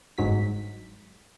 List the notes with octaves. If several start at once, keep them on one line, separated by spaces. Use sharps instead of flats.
G1 G#2 F#3 B6